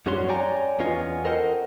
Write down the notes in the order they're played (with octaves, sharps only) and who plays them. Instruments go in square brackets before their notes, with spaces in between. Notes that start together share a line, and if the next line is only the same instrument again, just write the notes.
[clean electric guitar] F#2 G3 C#4 F#4 C#5 C6
C#5 D5 G5 G#5 A#5
E2 B3 C#4 F4 D#5 G#5
A4 A#4 C5 D#5 F#5 G5